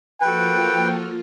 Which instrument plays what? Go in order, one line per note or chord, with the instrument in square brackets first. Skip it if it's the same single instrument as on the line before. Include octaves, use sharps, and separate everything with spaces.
[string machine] F3 A#3 F4 [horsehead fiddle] F#4 A4 [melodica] B4 [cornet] G5